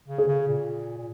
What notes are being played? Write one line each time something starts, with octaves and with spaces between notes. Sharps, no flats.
C#3
G#4
C#3
A#2
A#2